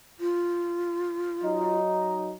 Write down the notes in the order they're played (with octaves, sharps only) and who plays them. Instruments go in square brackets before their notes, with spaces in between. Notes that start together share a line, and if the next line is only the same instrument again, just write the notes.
[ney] F4
[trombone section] F#3 D#4